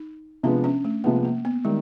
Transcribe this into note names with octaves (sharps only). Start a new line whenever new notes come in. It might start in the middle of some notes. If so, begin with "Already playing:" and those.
Already playing: D#4
C3 F3 G#3 B3 D4
C#4
A3
C3 F3 G#3 A#3 B3
A#3
B3
D#3 G3 G#3